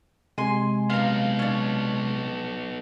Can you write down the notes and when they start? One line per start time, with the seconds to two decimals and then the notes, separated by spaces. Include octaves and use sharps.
0.38 C3 G#3 G#5 C6
0.90 B3 D#4 F5 A#5
1.39 C#4 D4